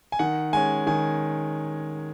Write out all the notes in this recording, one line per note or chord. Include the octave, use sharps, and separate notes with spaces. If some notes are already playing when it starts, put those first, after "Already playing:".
G#5
D#3 F#5
G#3 C#4 G#5
D#3 G#5